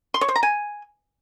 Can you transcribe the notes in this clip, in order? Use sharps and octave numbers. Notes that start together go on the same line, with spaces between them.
C6
C#5
C5
A#5
G#5